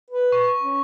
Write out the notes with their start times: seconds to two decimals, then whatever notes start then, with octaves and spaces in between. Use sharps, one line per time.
0.11 B4
0.32 C#6
0.62 C#4